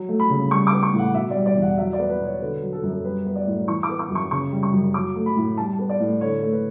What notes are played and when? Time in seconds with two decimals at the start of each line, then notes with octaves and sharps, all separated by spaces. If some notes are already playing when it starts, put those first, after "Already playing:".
Already playing: F#3
0.09 A3
0.20 B5
0.30 C#3
0.51 G3 C#6
0.67 D6
0.72 B3
0.83 C#6
0.94 A2 F#5
1.14 B2 E5
1.30 D5
1.36 G3
1.46 D5
1.56 E2
1.62 F#5
1.78 F#3 E5
1.93 D5
1.99 B3
2.10 B4
2.19 B2
2.25 C#5
2.41 D3 B4
2.62 F#3
2.73 A4
2.83 F#2
2.93 A4
3.04 G3 B4
3.25 B3
3.36 D5
3.47 A2
3.68 E3 C#6
3.83 D6
3.89 B3
3.99 D6
4.10 F#2
4.15 C#6
4.31 C#3 C#6
4.52 G3
4.63 C#6
4.73 F#2
4.94 F#3 D6
5.16 A3
5.26 B5
5.37 A2
5.58 G3 A5
5.79 B3
5.90 D5
6.00 A2
6.21 D3 C#5
6.42 A3
6.53 B4